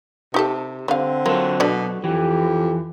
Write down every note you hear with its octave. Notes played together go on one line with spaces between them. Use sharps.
C3 D#4 G4 A4
D3 G3 C4 F5
F#3 A#3 F4 A4
B2 D3 D5
F2 E3 G4